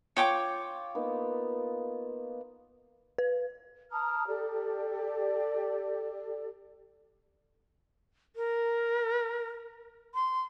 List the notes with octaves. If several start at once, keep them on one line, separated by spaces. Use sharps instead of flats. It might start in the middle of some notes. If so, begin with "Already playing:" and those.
F4 C#5 G5 D6
A#3 B3 D#4
B4
A5 A#5 D#6 F6
G4 A4 D5
A#4
C6